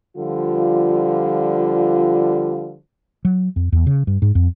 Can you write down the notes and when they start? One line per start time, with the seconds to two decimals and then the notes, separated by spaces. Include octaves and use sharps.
0.17 D3 F3 G3 F4
3.25 F#3
3.56 F2
3.72 E2
3.87 C#3
4.07 G2
4.22 G#2
4.35 F2